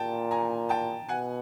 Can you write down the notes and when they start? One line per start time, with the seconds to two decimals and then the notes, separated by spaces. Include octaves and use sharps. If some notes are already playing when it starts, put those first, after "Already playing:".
Already playing: A#2 G5 A5
0.31 G#5 A#5
0.69 G5 A5
1.08 B2 F#5 G#5